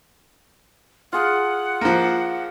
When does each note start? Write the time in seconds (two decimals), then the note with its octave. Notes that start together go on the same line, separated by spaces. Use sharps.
1.13 F4 G#4 F#5
1.81 F3 A#3